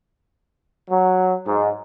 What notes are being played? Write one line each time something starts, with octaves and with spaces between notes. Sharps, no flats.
F#3
G#2